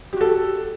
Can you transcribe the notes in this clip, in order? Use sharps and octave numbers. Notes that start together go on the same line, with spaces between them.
F#4 G4 A4